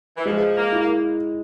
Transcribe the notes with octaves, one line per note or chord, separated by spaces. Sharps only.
E3
F3 G#3
A#3
E4
A#3